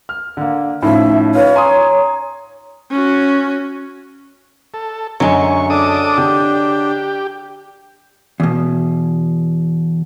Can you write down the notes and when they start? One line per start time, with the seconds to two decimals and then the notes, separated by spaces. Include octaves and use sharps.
0.09 F6
0.37 D3 A#3
0.82 A2 F3 C#4 D#4 E5 B5
1.35 F4 B4 C#5
1.56 G#5 A#5 C6 D#6
2.91 C#4 F#4
4.74 A4
5.20 F#2 D3 F#3 G#3 C#6
5.70 D4 A4 D6 D#6
6.18 D3 G4
8.40 E2 B2